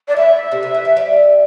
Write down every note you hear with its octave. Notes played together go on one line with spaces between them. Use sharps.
D5
A3 E5
C3
D3
E3
F3
G3